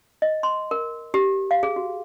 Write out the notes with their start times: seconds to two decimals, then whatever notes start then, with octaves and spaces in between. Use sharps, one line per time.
0.22 D#5
0.43 C6
0.71 A#4
1.14 G4
1.51 F5
1.63 G#4
1.76 F#4